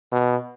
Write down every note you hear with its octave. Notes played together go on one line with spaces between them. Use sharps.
B2